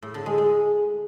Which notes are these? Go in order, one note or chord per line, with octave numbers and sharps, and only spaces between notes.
A2
D3
G#3
G#3